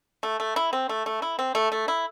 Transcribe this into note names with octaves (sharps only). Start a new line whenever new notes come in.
A3
A3
E4
C4
A3
A3
E4
C4
A3
A3
E4